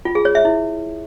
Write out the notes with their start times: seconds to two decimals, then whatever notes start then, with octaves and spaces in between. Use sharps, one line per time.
0.05 F4
0.15 G#4
0.25 C#5
0.35 E5
0.45 E4